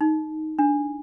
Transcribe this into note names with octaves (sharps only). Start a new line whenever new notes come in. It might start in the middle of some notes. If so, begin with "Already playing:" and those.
D#4
D4